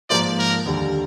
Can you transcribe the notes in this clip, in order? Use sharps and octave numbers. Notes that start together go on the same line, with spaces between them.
G#2 F3 A#3 F4 C5 D5
A#4
D#2 D3 G3